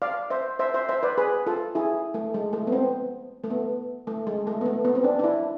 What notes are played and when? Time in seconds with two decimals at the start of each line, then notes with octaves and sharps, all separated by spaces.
0.02 D5 F5
0.30 C5 E5
0.59 C5 E5
0.74 C5 E5
0.89 C5 E5
1.03 B4 D5
1.18 G#4 B4
1.47 F4 A4
1.75 E4 G#4
2.14 A3
2.34 G#3
2.53 A3
2.67 B3
2.72 C4
3.44 A3
3.50 B3
4.07 A3
4.27 G#3
4.47 A3
4.61 B3
4.66 A3
4.85 B3
4.95 C4
5.04 D4
5.19 D4
5.24 E4